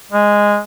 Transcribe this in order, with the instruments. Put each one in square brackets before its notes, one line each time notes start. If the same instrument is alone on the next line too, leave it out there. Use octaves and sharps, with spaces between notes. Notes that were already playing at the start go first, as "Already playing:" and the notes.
[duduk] G#3